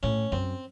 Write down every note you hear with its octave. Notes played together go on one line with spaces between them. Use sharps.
A2 C#4
F#2 C4